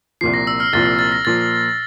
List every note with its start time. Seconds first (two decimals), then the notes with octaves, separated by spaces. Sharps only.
0.21 C2 A#2 F3 C7
0.34 A#6
0.47 E6
0.60 F6
0.73 C2 A#2 F3 A6
0.86 A#6
0.99 A6
1.12 A#6
1.25 A#2 F3 A6